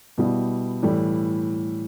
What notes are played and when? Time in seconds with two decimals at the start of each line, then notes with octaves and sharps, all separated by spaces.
0.18 B2 G3 B3 E4 G4
0.82 A2 E3 G3